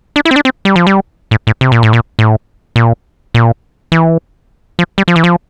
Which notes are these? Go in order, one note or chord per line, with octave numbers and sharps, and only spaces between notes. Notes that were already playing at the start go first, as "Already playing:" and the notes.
D4
E4
C4
D4
C4
G3
F3
G3
A2
A2
C3
A#2
A2
A#2
A2
A#2
A#2
E3
F3
G3
F3
E3
F3